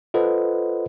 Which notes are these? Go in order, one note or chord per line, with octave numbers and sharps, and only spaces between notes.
F4 A4 B4 C5 D#5 F#5